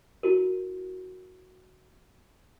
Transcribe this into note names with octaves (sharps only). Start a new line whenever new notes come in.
E4 F#4 A#4